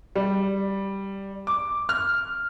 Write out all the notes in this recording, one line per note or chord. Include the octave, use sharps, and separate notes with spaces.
G3
D6
F6